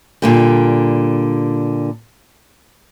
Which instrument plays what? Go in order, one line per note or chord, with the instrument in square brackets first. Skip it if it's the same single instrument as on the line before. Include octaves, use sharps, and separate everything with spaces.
[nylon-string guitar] A#2 D3 G3